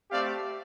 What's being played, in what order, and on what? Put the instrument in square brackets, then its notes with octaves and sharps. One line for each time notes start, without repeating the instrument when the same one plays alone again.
[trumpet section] A3 C4 G4 D5 F5